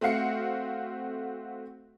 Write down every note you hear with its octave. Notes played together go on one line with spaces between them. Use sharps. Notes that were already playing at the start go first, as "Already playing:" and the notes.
A3 C4 F#4 F5 C7 C#7